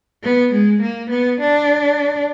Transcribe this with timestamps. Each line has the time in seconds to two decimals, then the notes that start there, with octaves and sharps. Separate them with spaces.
0.23 B3
0.52 G#3
0.81 A#3
1.10 B3
1.40 D4